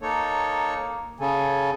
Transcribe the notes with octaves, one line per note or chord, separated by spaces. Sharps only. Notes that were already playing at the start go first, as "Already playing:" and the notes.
A#3 D#4 A4 C#5
C#3 A4 G#5